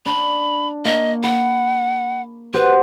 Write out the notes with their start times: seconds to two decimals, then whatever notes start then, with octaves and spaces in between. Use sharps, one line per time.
0.06 D4 B5
0.85 A#3 D#5 C#6
1.23 F#5 B5
2.54 F#4 G4 B4 C5